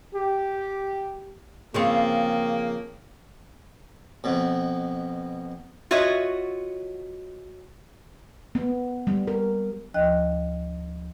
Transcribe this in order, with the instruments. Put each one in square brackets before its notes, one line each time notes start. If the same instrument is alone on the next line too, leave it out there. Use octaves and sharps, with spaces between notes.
[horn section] G4
[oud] C#3 F3 C4 [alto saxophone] A#3
[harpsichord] F2 B2
[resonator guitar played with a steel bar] F4 F#4 C#5 D#5 E5
[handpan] B3
G3
A#4
[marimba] D2 F3 D#5 G5 F#6